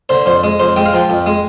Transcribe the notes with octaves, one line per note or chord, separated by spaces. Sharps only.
D3 C5
F2 C5
G#3
F2 C5
G#3 G5
F5
F3 G5
F2
G#3